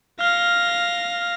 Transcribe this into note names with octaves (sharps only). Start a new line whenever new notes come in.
F5 F6 A#6